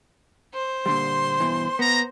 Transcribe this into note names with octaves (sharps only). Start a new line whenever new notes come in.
C5
A#2 D3 G3 C6
G2 B2 E3
B3 A#5